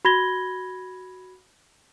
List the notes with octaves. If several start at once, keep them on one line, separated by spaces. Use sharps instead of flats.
F#4 B5 G#6 A#6 G7